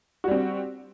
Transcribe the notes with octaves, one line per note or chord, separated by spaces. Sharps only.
G3 C4 F#4